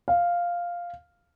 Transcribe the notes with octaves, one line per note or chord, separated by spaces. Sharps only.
F5